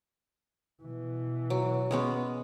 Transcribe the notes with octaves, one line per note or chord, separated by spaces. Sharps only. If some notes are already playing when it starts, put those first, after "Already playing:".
B2 E3
F#3
G#3 B3 C#4